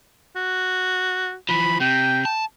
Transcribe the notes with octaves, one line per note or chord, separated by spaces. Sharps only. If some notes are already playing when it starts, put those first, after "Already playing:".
F#4
E3 F3 B5
C3 G5
A5